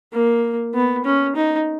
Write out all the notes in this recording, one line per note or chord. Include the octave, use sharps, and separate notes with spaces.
A#3
B3
C#4
D#4